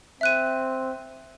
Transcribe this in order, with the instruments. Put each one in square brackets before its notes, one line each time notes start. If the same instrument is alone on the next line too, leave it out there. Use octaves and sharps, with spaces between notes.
[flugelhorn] C4 [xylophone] E5 F#6 D#7